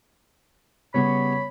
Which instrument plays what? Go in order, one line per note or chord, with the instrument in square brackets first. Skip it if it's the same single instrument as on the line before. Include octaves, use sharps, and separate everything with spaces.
[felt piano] C#3 G3 B3 [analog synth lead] C#5 [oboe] B5